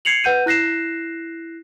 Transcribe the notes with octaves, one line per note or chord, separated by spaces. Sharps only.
G#6 C7 C#7 F7 F#7
B4 F#5 G6 D#7
E4 F#6 A#6 C7 E7